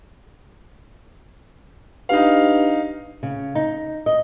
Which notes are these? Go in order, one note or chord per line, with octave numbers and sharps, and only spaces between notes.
D4 D#4 G4 B4 F5
C#3
D#4
D#5